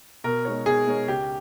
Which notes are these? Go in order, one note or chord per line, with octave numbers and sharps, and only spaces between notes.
B2 A#4
G#3 D#4 A#4 C#5
B2 G#4
G#3 D#4 A#4 C#5
C#2 G4